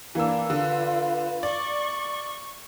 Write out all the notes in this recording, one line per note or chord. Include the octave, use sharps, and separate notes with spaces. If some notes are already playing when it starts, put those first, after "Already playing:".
E3 A#3 D4 E6
D3 F4 B4
D5 C#6